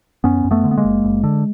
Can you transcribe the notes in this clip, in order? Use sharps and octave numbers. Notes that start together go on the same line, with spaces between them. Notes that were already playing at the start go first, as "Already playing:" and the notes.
F#2 B3 C#4
F#2
A3 B3
D3
B3
G#3 A#3
F#1
F#1
D3